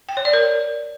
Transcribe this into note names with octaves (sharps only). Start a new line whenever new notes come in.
G5
C#5
D5
A#4